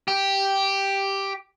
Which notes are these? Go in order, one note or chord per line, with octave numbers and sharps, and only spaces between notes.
G4